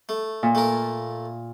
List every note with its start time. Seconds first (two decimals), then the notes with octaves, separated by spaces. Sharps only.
0.09 A3
0.43 A#2
0.55 A3 A#4